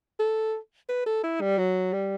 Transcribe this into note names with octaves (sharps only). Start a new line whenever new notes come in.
A4
B4
A4
E4
G3
F#3
G3